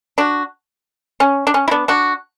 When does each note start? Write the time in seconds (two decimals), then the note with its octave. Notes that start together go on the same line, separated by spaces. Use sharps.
0.18 D4 F#4
1.20 C#4
1.47 D4
1.54 C#4
1.68 E4
1.71 B3 D4
1.88 D4 F#4